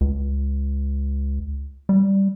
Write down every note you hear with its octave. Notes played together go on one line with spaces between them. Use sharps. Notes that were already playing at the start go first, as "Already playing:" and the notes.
C#2
G3